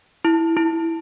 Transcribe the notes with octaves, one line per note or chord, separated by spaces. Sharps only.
E4
E4